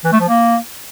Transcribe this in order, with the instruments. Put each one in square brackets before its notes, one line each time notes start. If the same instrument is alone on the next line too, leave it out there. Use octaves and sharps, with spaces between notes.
[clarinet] E3
A3
F3
A#3